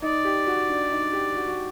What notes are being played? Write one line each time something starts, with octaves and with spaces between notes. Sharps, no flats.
D#4 D5
G4
F#4
D4
D#4
G4
F#4
F#4